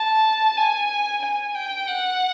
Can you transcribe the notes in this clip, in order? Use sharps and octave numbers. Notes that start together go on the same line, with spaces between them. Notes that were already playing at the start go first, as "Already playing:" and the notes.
Already playing: A5
G#5
G#5
G5
F#5